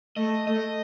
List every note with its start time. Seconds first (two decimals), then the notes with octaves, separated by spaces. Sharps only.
0.16 A3 D#5
0.48 A3 D#5